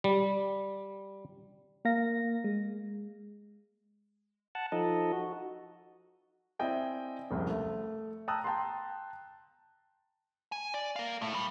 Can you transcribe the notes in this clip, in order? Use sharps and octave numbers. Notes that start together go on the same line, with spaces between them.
G3
A#3 A#4 F5 A#6
G#3
F#5 A5
F3 D#4 A4 D#5
F#4
C4 E4 D5 D#5 G5 G#5
F#1 C2 F2
A3
G5 A5 A#5 D#6 E6 F#6
G5 A5 A#5 C6
G#5
D5
A#4 F5
A2 A3
G3